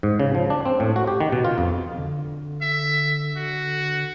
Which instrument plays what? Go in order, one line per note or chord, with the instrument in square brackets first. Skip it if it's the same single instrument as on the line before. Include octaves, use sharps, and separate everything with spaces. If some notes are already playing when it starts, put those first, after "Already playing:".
[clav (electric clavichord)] G#2
C#3
F3
D4
C4
A2
F#4
G4
D#3
B2
F4
F2
[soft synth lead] D3
[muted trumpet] E5
F#4